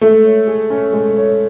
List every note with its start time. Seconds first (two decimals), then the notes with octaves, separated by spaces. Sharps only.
0.01 G#3 A3
0.25 C#5
0.48 G#4
0.70 C#4
0.93 G#3
1.16 C#5